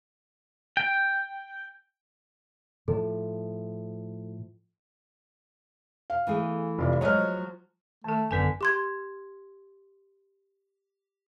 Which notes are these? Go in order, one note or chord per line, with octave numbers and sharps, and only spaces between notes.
G5
A2 F3 A4
F5
E3 A3 G#4
F1 F4 D5
F3 F#3 G#3 C#5 D#5 F6
D#3 A3 A4 A5
G#1 F#2 D3 B3 B4 G#5 B6
G4 C6 G#6